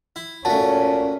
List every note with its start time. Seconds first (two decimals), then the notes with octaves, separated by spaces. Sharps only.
0.16 E4
0.45 A#2 A3 C#4 F#4 A5